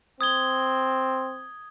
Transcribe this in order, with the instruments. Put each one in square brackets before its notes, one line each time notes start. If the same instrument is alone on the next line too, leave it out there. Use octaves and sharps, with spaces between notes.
[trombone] C4 [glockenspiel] D#6 G#6 G7